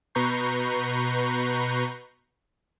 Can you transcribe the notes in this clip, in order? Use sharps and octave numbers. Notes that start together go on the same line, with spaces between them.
B2 B4 A#5 C#6 G6 C7